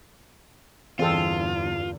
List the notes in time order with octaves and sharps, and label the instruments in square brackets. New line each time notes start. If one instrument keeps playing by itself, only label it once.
[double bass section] E2 G2 D3 [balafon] E3 [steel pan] C4 G#4 A4 [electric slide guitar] F4